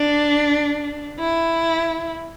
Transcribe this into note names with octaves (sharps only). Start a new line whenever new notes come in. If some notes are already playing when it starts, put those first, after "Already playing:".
Already playing: D4
E4